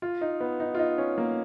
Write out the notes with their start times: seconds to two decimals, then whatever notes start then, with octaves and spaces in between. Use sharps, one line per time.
0.02 F4
0.21 D#4
0.40 B3
0.60 D#4
0.75 F4
0.79 D#4
0.98 C#4
1.18 A#3